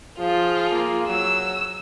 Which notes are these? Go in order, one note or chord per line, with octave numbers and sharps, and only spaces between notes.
F3 F4 G#4
A#3
F#3 E6